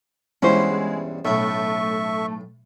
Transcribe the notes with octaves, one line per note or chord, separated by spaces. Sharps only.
E2 G2 B2 G#3 C#4 E4 C5
B1 A2 A3 E5 C#6